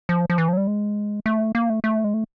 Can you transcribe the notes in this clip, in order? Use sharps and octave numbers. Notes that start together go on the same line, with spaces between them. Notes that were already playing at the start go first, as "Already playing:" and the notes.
F3
F3
E3
F3
F#3
G3
G#3
A3
A#3
A3
A3
G#3
A3